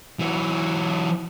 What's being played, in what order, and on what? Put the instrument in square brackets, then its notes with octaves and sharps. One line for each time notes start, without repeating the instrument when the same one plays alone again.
[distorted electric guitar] E3 F#3